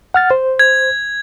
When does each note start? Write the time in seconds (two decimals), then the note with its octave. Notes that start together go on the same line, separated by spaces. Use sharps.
0.14 F#5 F6 A6
0.31 C5
0.59 G#6